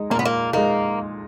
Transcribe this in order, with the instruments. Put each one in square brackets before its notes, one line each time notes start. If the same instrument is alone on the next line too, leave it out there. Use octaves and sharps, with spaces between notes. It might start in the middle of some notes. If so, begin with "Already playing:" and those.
Already playing: [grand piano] G#3 D#4
[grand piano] A#2 [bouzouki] A#3
[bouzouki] B3
A#3
[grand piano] G#3 D#4 [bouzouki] A#3